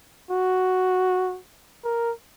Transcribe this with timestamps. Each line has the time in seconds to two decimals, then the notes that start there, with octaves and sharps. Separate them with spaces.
0.31 F#4
1.84 A#4